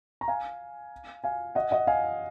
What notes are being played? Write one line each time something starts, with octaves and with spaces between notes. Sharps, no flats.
A#5
F5 G#5
F5 G#5
D#5 F#5
D#5 F#5
F5 G#5